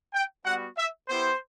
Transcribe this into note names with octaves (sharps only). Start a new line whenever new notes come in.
G5
G3 B3 F#4 F#5
E5
B3 E4 G4 C5